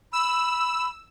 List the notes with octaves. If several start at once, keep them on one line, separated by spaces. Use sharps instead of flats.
B5 E6